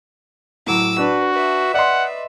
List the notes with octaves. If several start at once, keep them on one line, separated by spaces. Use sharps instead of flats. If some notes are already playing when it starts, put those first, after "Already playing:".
A2 F#3 D6 E6
D4 F#4 B4
B4 E5
D5 D#5 F#5 C6